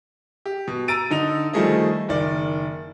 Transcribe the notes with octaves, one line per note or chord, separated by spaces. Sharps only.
G4
B2
A#5 E6 A6 D7 D#7
D3 D#4 F7
D#3 F3 G3 A3 G#4 D#5
F#1 D#3 D5